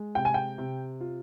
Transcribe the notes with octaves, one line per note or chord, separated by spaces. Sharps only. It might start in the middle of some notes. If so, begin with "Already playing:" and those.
Already playing: G#3
C3 G5
G#5
G5
C3
F4